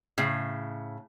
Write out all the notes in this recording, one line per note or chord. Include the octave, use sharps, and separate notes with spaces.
A2 C#3